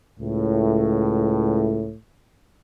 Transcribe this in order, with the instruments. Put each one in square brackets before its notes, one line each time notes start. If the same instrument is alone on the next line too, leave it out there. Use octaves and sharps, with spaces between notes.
[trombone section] C#2 A2